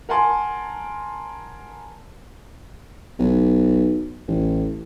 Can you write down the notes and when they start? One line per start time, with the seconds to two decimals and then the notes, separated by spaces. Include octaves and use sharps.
0.09 A#4 F#5 G#5 A5 C6
3.19 B1
4.28 A1